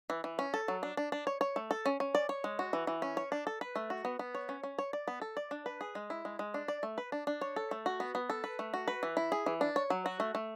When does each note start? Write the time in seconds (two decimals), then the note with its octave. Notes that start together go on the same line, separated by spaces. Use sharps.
0.10 E3
0.24 E3
0.39 C#4
0.54 A4
0.68 F#3
0.83 D4
0.97 D4
1.12 D4
1.27 C#5
1.41 C#5
1.56 A3
1.71 A4
1.86 C#4
2.00 C#4
2.15 D5
2.29 C#5
2.44 G#3
2.59 F#4
2.73 E3
2.87 E3
3.02 C#4
3.17 C#5
3.32 D4
3.47 A4
3.61 B4
3.76 A3
3.90 F#4
4.05 B3
4.19 B3
4.35 C#5
4.49 C#4
4.64 C#4
4.79 C#5
4.93 D5
5.08 B3
5.22 A4
5.37 D5
5.51 D4
5.66 B4
5.81 G#4
5.95 G#3
6.10 E4
6.25 G#3
6.39 G#3
6.54 D4
6.68 D5
6.83 A3
6.98 B4
7.12 D4
7.27 D4
7.41 C#5
7.56 A4
7.71 A3
7.86 F#4
8.00 B3
8.15 B3
8.30 A4
8.44 B4
8.59 A3
8.74 F#4
8.88 B4
9.03 E3
9.17 E4
9.32 G#4
9.46 E3
9.61 D4
9.76 C#5
9.90 F#3
10.06 F#4
10.20 A3
10.35 A3